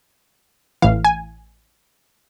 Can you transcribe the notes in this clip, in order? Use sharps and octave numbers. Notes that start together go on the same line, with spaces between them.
A1 A2 E3 F5
G#5